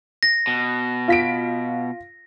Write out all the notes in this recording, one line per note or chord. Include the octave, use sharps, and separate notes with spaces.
A#6
B2
F4 B6 D7